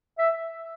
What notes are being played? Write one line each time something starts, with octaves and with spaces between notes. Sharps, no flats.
E5